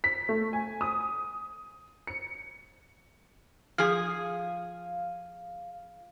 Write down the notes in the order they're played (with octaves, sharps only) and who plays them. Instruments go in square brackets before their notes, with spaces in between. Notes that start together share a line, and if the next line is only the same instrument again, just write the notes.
[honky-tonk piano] B6
A3
G#5
D#6
C#7
[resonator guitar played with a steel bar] F3 G#4 [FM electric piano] F5